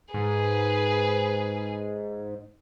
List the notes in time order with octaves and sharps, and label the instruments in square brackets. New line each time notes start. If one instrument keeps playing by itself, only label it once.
[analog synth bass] G#2 [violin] G#4 B4